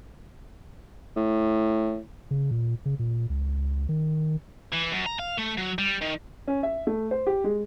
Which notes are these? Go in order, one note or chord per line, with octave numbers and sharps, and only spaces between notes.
A2
C#3
A#2
C#3
A#2
C#2
D#3
E3
F#2
A#5
F5
A3
F#3
G3
D#3
C#4
E5
A3
C5
G4
G#3